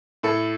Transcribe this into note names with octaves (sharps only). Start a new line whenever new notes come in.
A2 A4